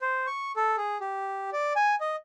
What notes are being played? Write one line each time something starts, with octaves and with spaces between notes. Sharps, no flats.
C5
C#6
A4
G#4
G4
D5
G#5
D#5